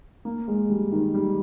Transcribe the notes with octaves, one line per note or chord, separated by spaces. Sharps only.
A#3
G#3
G3
D#3
G3